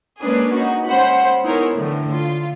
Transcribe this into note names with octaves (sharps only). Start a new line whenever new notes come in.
G#3 A#3 C#4 D4 G#4 B4
D#4 F#4
G#3 C#4 C5 F#5 B5
B3 D#4 E4 G#4 A#4 C#5
A2 D3 E3
A3 F4